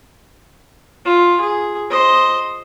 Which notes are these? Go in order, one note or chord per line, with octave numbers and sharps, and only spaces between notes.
F4
G#4
C5 D#5